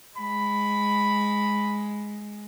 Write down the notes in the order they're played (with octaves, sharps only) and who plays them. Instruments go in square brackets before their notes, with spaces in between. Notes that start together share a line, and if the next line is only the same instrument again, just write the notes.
[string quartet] G#3 [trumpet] B5